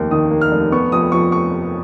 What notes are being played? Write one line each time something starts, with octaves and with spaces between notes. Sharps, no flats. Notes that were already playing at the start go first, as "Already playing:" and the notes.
Already playing: F1 D#2 A#3
D#3 D#6
A#3
F6
F1
B3 C#6
F2 D#6
F3 C#6
C#6